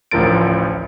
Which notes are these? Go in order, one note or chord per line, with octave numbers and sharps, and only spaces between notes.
A1 D2 F3 A#4 A6 D7